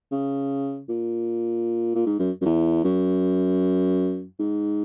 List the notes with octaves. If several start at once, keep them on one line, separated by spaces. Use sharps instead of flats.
C#3
A#2
A#2
G#2
F#2
F#2
E2
F#2
G#2